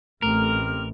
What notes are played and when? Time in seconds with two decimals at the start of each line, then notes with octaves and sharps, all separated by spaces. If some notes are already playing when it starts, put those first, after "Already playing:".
0.22 A1 A3 C4 G4 A#4 F6